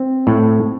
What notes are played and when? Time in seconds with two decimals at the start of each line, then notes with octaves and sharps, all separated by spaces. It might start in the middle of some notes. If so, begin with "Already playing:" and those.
Already playing: C4
0.27 A2